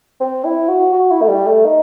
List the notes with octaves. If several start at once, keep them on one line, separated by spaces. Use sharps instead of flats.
C4
E4
F#4
F#4
E4
A3
G3
A3
D#4